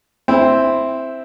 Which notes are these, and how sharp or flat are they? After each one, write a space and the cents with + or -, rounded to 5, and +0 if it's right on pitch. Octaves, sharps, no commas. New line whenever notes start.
C4 +0 E4 +0